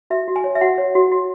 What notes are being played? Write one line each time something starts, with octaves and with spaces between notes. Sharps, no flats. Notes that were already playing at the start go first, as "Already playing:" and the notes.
F#4 E5
F#4
G#5
C#5
E5
F#4 F#5
C#5
F#4
F#4